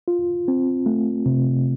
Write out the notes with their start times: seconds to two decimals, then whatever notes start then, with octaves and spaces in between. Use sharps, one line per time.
0.08 F4
0.48 C4
0.86 A3
1.26 C3